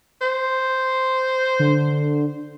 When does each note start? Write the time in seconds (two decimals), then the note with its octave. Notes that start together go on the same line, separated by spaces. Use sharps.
0.21 C5
1.59 D3